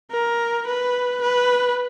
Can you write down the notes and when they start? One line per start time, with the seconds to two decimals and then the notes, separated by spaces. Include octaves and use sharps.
0.11 A#4
0.67 B4
1.22 B4